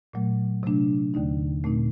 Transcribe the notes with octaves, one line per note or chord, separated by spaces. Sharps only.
A#2 F#3 A3
C3 F#3 A3 D4
D#2 D3 A3 D#4
A#2 A3 C4 D#4